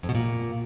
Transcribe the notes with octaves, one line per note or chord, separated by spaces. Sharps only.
F2
B2
A#2